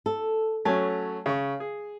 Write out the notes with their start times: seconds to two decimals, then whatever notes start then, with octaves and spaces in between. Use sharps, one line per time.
0.06 A4
0.65 F#3 A3 C#4 G#5 A5
1.26 C#3 C#6
1.60 G#4